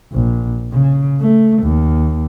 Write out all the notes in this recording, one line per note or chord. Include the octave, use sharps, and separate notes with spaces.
A#1
C#3
A3
D#2